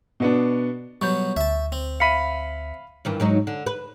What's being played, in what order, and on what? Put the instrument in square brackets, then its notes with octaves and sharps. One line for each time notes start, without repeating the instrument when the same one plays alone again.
[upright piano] B2 B3 D4
[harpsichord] B2 F#3 [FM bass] G3 [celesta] C#6 G6
[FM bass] D2 [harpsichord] E5 A5
[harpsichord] C4
[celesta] E5 B6 C#7 [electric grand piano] F5 B5 D#7
[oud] G2 D#3 E3
G#2 F#3 D#4
D3
B4